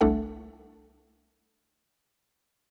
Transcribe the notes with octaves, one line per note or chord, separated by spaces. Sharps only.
G1 C2 A3 D4 A4 F#5